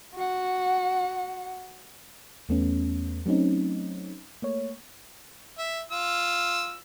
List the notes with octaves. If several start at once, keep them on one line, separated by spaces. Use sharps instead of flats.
F#4 F#5
E2 A3 B3 C#4
F#3 A3 C4 C#4 D#4
A3 A#3 C#5
E5
F4 E6